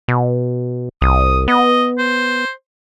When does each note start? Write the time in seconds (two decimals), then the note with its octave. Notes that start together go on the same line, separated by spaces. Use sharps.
0.08 B2
1.02 C2 D#6
1.48 B3 D#5
1.98 C5